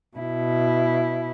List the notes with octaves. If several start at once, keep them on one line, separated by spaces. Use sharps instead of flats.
B2 E4